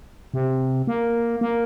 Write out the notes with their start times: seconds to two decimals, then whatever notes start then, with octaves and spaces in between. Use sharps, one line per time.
0.34 C3
0.87 A#3
1.41 A#3